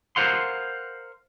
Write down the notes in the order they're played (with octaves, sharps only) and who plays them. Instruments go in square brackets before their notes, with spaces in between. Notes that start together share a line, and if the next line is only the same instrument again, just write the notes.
[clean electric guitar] A#4 C5 F5 F#5 C6